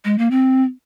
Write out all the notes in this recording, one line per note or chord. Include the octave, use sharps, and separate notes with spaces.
G#3
A#3
C4